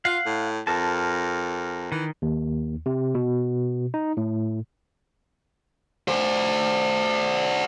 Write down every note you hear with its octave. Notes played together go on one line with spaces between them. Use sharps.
F4 F5 F#5
A2
F2 A#4 A5
D#3 E3
D#2
C3
B2
D#4
A2
F#4 C5